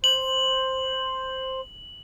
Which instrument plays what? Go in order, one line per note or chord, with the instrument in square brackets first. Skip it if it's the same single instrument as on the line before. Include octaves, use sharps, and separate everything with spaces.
[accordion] C5 [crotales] F#7